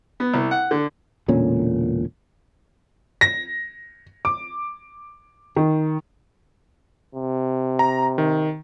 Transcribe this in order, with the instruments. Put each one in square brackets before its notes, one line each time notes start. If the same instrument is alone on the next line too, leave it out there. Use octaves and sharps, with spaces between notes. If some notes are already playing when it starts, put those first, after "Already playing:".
[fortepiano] B3
C2
F#5
D3
[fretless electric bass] E1 A#2 D3 C#4
[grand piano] A#6
D6
D#3
[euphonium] C3
[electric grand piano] A#5
D#3